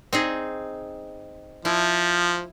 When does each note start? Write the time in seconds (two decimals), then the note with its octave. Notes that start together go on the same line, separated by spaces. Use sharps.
0.13 C4 D#4 G#4
1.65 F3 E4